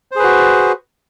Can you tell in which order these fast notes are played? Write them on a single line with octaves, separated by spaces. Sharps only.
C5 G#4 B4 F#4